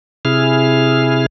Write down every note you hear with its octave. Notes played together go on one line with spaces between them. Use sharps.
C3 E4 G#4 F6